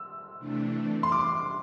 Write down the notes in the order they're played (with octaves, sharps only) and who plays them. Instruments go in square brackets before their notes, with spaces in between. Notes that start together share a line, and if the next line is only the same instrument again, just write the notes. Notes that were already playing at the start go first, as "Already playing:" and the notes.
Already playing: [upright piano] E6
[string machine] C3 E3 A3 D4
[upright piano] C6
D6